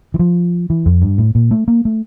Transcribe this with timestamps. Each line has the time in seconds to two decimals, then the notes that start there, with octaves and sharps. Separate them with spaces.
0.14 E3
0.19 F3
0.70 E3
0.86 F2
1.02 G2
1.18 A2
1.35 A#2
1.51 A3
1.68 A#3
1.85 A3